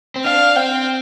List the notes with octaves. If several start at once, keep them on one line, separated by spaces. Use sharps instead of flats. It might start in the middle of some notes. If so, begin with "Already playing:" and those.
C4
D4 F5
C4 G5